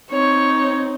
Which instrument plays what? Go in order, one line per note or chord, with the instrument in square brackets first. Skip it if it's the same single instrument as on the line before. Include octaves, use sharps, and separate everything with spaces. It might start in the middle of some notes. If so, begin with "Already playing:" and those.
[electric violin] C4 D#4 [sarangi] C#5